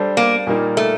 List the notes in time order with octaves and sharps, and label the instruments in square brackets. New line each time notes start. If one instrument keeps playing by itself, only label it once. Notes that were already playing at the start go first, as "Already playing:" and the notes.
Already playing: [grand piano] G3 D4 A4 C5
[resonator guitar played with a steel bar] A#3
[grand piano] A#2 G3 A#3 D#4
[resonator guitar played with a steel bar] A3